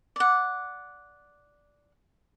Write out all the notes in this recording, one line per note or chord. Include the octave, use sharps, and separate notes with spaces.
D5 F#5